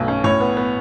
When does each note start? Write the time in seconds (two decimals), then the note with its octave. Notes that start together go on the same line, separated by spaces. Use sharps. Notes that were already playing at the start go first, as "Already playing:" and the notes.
Already playing: B1 B2 A3
0.08 C#4
0.24 A2 C#5
0.40 B3
0.57 B3